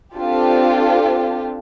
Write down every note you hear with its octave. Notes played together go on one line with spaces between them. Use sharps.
C4 D4 F4 G4 A4